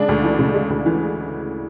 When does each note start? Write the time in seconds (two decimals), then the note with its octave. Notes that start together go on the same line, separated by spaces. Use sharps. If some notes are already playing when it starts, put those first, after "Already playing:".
Already playing: C#3 G#3 D4
0.09 D2
0.24 E3
0.39 C#3
0.54 G#3
0.70 D2
0.86 E3